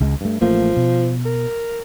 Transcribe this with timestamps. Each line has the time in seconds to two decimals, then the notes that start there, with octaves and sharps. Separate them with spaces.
0.01 C#2 G#3
0.21 G2 A3
0.41 A1 F3 A3 A#3
0.77 B2
1.25 A#4